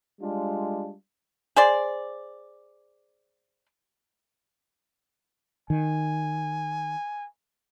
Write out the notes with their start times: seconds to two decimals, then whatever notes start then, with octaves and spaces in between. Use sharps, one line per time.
0.20 G3 G#3 D4 F4
1.56 G#4 C5 D5
5.70 D#3 G#5